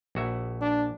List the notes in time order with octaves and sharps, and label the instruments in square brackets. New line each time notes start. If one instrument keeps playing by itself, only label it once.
[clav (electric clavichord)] A#1 F#4 E5
[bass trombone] D4